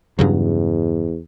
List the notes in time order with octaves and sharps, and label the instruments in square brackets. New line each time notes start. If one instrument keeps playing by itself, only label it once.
[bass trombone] E2 [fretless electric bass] G2 C#3 F#3